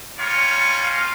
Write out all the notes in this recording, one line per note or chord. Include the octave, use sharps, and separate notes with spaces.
G3 A#3 C#4 F4 C#5
F5